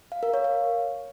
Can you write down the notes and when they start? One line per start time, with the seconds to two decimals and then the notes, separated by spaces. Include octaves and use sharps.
0.12 F5
0.23 A#4
0.34 C#5
0.44 F5